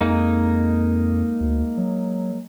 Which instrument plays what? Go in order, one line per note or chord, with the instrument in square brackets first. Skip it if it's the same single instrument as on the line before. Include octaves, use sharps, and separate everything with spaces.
[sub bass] F2 [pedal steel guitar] G#3 A#3 D#4
[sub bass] D2
F#3